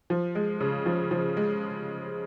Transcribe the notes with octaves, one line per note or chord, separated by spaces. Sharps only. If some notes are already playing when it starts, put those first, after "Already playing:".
F3
G#3
C#3
F3
F3
G#3